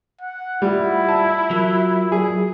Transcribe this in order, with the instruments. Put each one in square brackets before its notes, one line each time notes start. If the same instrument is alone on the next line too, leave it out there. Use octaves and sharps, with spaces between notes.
[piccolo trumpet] F#5
[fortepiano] G3 [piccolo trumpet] E4 [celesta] F4 G4 F#5
[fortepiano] A5
[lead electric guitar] F#3 [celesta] F4 A#4
[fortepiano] G#4